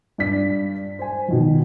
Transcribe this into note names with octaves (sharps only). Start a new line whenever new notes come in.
G2 D5 B6
C5 G#5
B2 D#3 F3